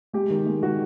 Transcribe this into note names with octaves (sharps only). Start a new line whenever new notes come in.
G#3 G4
D#3
G#3
D#3 F#4